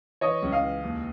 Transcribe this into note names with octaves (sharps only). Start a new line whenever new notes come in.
E3 C#5 D#5
C#2
D#5 F5
E3
D#2